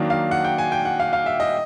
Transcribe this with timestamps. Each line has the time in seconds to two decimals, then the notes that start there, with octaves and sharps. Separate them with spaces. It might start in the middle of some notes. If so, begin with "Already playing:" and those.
Already playing: D#3 F#3 A#3 D4
0.10 F5
0.31 F#5
0.44 G5
0.58 G#5
0.72 G5
0.85 F#5
1.00 F5
1.13 F5
1.26 E5
1.40 D#5